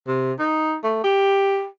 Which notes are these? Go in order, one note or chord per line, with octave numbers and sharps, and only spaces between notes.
C3
D#4
A3
G4